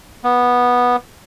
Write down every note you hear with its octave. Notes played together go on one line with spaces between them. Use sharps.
B3